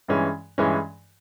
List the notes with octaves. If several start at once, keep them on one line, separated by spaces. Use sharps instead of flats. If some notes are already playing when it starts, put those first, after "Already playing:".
G2 E3 G#3 C#4
G2 E3 G#3 C#4